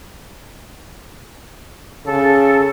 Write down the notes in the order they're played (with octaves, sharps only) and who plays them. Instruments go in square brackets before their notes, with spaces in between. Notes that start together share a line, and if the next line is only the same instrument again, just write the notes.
[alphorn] C#3 [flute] A4